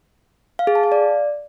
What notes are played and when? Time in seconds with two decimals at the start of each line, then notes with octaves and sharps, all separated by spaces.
0.59 F5
0.67 G#4
0.75 A5
0.84 F5
0.92 D5